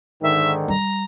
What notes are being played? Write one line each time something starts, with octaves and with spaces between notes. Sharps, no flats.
G#2 D3 D#3 E5
G3 A#5